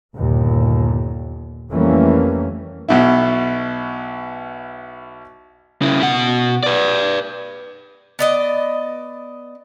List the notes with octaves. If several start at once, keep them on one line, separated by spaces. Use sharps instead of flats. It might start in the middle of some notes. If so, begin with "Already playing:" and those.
G1 D#2 A#2
F2 E3 G3 A3 A#3 C#4
B1 B2 E4
C#3 E4
B2 F#5
B4 D5
B3 D5 D#5